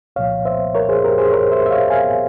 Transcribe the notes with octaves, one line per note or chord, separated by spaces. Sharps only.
C2 A#2 F3 C#5 F5
C5 E5
A#4 C#5
G#4 C5
G4 A#4
G#4 C5
A#4 C#5
C5 E5
E5
C#5 F5
F5 G#5